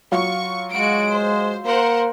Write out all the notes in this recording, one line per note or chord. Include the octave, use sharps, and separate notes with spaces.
F#3 F4 C#6
G#3 F#4 D7
C5
A#3 A#4 C5 F#5